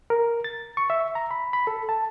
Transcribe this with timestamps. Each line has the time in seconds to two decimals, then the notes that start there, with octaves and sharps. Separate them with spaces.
0.10 A#4
0.44 A6
0.77 C#6
0.90 E5
1.15 A#5
1.31 B5
1.53 B5
1.67 A4
1.89 A5